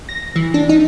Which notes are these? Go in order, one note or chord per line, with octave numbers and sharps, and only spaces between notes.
A#6
E3
D4
D#4